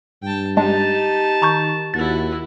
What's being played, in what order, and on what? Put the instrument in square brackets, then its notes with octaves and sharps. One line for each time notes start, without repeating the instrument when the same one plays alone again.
[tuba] G2 [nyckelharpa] G5 A5
[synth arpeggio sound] G#3 D4 [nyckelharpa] D#4 G4 [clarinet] A5
[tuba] D#3 [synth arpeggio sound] A#5 C#6 G6
[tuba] D#2 [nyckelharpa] E4 F#4 [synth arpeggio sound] A6